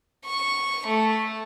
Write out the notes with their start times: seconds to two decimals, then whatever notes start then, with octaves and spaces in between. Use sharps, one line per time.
0.25 C#6
0.87 A3